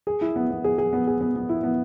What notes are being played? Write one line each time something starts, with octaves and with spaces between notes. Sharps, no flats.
G#4
E4
B3
B3
G#4
G#4
B3
G#4
B3
B3
E4
B3